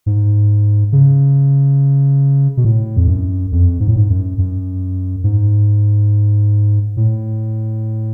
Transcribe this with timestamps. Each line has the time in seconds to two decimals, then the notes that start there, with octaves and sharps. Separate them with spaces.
0.06 G#2
0.92 C#3
2.57 B2
2.65 A2
2.97 F2
3.08 F#2
3.52 F2
3.80 G#2
3.88 A2
3.96 G#2
4.10 F#2
4.38 F#2
5.24 G#2
6.97 A2